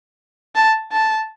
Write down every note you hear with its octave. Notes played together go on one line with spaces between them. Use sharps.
A5
A5